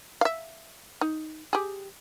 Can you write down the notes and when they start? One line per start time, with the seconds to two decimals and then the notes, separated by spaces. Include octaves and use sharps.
0.21 E5 F5
1.01 D#4
1.53 G4 G#4